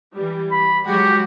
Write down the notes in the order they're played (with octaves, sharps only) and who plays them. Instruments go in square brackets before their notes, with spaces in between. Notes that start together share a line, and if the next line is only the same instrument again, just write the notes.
[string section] E3 G3
[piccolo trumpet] B5
[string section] F#3 G#3 F#4 [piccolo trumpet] G4